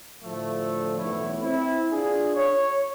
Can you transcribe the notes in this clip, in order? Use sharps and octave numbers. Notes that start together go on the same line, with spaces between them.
A2 D3 F3 A3
B1 E2 A3 E4 C#5
C4 E4
D4 F4 G#4
C#5